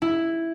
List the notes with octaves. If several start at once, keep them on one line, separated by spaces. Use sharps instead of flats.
E4